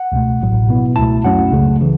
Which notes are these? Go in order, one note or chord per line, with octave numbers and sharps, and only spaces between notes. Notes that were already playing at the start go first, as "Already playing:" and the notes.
Already playing: F#5
C#2 B2 A3
A1 A2 F#3
B2 B3 E4
C#2 B2 A3 E4 A5
F#2 F#3 A3 C#4 E4 F#5
C#2 C#3 A3
C#3 E3